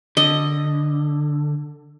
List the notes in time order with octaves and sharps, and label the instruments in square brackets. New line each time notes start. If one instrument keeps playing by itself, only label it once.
[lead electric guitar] D3 [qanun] D#5